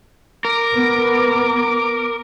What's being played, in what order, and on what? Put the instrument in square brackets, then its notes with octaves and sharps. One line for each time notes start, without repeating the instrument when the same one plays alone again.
[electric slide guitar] A#4 [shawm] D6
[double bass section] B3